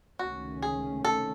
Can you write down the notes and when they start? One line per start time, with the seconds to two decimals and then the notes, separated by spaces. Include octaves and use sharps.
0.19 C#2 C3 D#3 A3 C#4 F#4
0.62 G#4
1.05 A4